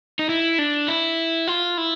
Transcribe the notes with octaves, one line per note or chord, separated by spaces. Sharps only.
D#4
E4
D4
E4
F4
E4